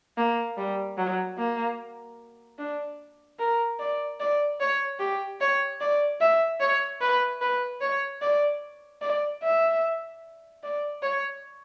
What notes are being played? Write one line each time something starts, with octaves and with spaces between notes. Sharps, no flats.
A#3
G3
F#3
A#3
D4
A#4
D5
D5
C#5
G4
C#5
D5
E5
C#5
B4
B4
C#5
D5
D5
E5
D5
C#5